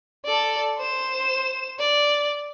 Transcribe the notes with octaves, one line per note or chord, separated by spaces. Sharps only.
A4 D5
C5 E7
D5